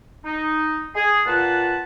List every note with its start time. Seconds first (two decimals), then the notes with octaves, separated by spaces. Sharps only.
0.25 D#4
0.96 G#4
1.26 A#2 F4 B4 F#5 A5